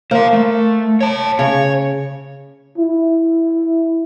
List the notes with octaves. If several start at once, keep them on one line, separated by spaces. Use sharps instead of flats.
A#3 C5 F5
A3
C#5 A5
C#3 C#5
E4